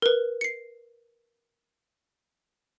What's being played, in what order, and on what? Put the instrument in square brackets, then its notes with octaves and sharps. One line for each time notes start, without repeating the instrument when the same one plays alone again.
[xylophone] A#4 B4
C7 C#7